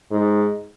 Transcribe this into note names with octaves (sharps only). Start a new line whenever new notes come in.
G#2